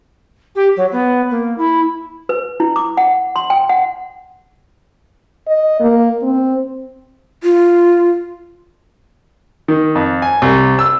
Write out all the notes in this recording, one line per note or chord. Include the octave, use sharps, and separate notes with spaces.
G4
F#3
B3
A#3
E4
B4
E4
D6
F#5
C6
G5
F#5
D#5
A#3
C4
F4
D#3
F2
G#5
C2
E6